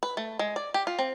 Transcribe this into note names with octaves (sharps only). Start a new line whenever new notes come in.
B4
A3
G#3
D5
G4
F4
C4